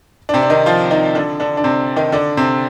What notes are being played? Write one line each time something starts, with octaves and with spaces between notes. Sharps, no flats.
D4
C3 C4
D4
D#3 D#4
F3 F4
D#3 D#4
D3 D4
D3 D4
D4
C3 C4
D#3 D#4
D3 D4
C3 C4